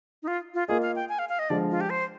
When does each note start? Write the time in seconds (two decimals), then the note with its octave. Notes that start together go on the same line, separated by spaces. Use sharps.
0.23 D#4
0.28 F4
0.54 F4
0.68 A#3 F4 G#4 A#4 D#5
0.82 F5
0.96 G5
1.09 G#5
1.19 F5
1.29 F5
1.39 D#5
1.50 D3 F3 G#3 D5
1.70 F4
1.81 G4
1.90 C5